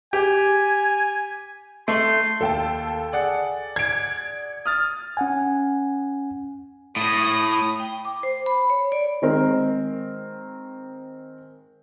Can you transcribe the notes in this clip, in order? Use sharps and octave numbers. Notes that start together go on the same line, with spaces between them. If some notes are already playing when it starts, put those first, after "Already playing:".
G4 G#5
A3 C6
D#2 A4 G5 A5
G#4 D5 F#5
G#6 D7
D#6 F6 A6
C#4 F#5 G#5
A2 D#6
G5
D6
C5
B5
C#5
D5
D#3 G#3 C4 A#4